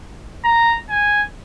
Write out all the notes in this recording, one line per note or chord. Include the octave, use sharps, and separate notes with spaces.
A#5
G#5